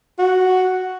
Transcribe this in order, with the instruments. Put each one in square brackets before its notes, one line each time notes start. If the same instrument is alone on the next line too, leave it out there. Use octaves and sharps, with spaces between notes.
[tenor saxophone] F#4